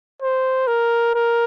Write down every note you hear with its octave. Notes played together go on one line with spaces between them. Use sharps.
C5
A#4
A#4